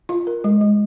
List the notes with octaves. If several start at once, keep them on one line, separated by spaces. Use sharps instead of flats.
F4
A#4
G#3
G#3